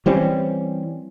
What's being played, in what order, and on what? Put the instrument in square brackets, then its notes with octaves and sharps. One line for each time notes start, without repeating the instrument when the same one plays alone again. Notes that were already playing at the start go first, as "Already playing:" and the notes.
[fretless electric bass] E3 G3 C4 C#4